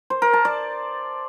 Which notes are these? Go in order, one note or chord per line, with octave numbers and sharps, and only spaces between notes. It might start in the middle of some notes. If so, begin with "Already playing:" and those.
C5
A#4
A5
D5